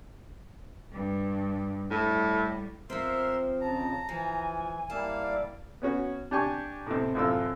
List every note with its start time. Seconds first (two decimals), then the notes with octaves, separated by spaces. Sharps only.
0.92 G2
1.90 A2 G3
2.90 F3 C4 A#4 E5 C6
3.61 F2 C#3 A5 A#5
4.09 E3 F3 G#5
4.90 G3 A#3 E4 F5 A5
5.22 D5
5.82 B3 C#4 F#4
6.31 D4 G4 G#5 C#6
6.86 A2 C3
7.15 F#2 A2 C3 F4 E6